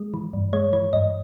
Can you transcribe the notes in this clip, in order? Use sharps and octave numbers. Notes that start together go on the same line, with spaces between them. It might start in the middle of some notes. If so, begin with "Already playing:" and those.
Already playing: G#3
E3
G2
G#3 C#5
E3 C#5
G2 D#5